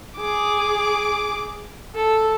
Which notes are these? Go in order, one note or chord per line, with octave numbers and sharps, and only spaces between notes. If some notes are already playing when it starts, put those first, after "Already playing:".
G#4 D6
A4